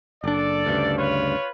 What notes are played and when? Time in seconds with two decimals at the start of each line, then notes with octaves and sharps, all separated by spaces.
0.24 F#1 D4 A4 D5
0.66 D2 G2 C#3
0.98 F4 B4 C#5